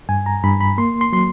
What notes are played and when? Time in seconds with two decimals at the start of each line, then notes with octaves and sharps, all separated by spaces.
0.09 G2 G#5
0.26 A#5
0.43 G2 B5
0.61 B5
0.78 A#3 C6
1.01 C6
1.13 F#3 C6